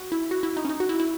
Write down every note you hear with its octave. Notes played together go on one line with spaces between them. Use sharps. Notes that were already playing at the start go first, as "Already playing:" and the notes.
Already playing: F#4
E4
F#4
E4
D#4
C#4
D#4
F#4
E4
E4